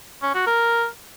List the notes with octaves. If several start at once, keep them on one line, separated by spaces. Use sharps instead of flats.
C#4
F#4
A#4